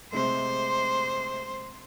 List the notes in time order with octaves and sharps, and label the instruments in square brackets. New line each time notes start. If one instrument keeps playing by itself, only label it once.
[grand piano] C3 G#3 A3 [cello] C5